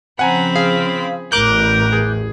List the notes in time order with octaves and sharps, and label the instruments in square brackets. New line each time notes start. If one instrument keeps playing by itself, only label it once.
[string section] C#3 F3 [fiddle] C4 B5 [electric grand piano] F#5 G#5 A#5
[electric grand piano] G#4 [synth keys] F5
[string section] A1 E2 A2 [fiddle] A#4 [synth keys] D6 F#6 G6
[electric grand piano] G#4